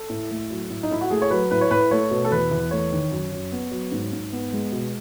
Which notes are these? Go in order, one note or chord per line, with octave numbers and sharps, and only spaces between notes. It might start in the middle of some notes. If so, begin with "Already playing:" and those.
Already playing: A4
A2
A3
F#3
A2
D#4
A2 E4
F#4
A3 G#4
C#5
F#3 B4
A2 B4
C#5
A2 B4
A3 C#5
B2
A4
E2 B4
E2
A3 C#5
D#3
F#2
F#2
B3
F#3
G#2
G#2
B3
G#3
B2